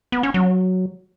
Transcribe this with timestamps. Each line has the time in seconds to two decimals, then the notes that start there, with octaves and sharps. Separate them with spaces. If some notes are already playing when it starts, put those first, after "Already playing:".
0.12 B3
0.23 C#4
0.34 F#3